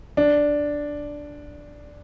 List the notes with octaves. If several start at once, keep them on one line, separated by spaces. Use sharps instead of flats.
D4